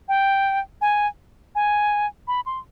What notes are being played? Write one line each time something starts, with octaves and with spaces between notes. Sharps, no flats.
G5
G#5
G#5
B5
C6